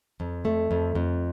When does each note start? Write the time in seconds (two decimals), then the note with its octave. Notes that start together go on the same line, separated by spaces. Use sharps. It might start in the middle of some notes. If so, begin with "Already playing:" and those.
0.20 F2
0.45 A3
0.71 F2
0.95 F2